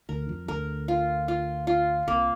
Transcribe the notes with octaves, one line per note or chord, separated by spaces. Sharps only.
D2 D3 A#4
F2 F3
D2 D3 A#4
F4
F4
F4
C2 C3 A#3